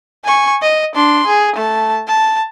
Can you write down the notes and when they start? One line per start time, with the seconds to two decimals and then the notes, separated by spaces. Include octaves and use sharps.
0.24 G#5 C#6
0.62 D#5
0.95 D4 C6
1.27 G#4
1.56 A3 A5
2.08 A5